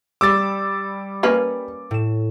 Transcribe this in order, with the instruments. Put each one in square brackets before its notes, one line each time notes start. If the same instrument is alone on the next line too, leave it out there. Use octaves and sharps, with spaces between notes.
[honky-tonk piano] G3 E6 [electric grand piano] D6 A6
[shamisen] A#3 C#4 B4
[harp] A2 E7